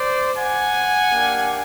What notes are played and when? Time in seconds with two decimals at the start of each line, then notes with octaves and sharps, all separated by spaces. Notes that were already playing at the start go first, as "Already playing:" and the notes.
Already playing: C5 D5
0.38 F#5 G#5
1.10 A#3 D4 G4